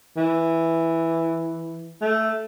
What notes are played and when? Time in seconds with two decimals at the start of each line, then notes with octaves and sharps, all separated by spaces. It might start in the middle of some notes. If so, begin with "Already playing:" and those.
0.17 E3
2.02 A3